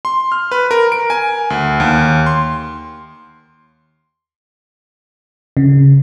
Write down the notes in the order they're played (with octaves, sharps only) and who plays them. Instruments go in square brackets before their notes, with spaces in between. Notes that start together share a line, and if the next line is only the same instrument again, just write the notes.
[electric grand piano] C6
F6
B4
A#4
D7
G#5
D2
D#2
C6
[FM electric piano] C#3